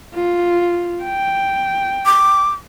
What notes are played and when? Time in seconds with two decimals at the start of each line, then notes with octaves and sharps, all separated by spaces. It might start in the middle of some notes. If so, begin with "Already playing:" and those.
0.15 F4
1.04 G5
2.06 D6